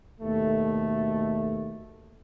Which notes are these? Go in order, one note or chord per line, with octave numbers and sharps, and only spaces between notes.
D#2 B2 A3